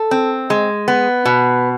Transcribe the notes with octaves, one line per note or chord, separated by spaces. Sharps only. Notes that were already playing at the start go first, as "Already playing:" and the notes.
Already playing: A4
C4
G#3
B3
B2